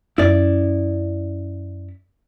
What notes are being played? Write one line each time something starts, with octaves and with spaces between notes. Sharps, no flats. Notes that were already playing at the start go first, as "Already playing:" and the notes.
F#2 C#4 E4 D5